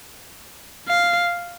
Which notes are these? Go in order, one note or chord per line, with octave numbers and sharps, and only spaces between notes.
F5